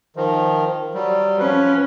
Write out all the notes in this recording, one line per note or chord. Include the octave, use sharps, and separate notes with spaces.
D#3 F3
F#3 G3
F3 C#4 B4